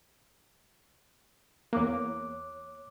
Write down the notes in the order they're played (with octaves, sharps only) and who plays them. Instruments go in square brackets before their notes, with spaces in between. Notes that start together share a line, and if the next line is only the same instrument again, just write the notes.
[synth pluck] E2 A#3 [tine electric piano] C#5 D6 F#6